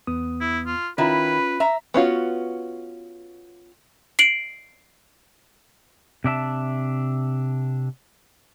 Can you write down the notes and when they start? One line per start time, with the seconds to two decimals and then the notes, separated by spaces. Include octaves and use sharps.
0.07 E2 B3 D#6
0.41 E4
0.67 F4
0.98 D#3 C#4 E4 F4 B4 B5
1.60 E5 A#5
1.94 B3 C#4 F4 F#4
4.19 C7 D7 F#7
6.24 C3 D4 E5 A5